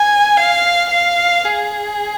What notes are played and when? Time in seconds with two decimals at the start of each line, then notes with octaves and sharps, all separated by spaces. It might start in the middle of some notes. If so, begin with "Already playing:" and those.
Already playing: G#5
0.37 F5
0.90 F5
1.45 G#4